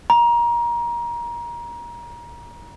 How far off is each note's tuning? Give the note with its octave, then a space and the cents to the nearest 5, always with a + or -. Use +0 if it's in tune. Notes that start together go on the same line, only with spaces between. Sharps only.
A#5 +25